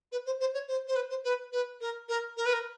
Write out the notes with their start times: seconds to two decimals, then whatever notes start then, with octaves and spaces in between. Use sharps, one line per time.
0.12 B4
0.26 C5
0.40 C5
0.54 C#5
0.67 C5
0.87 C5
0.95 B4
1.09 C5
1.24 B4
1.52 B4
1.80 A#4
2.08 A#4
2.37 A#4
2.45 B4
2.53 A#4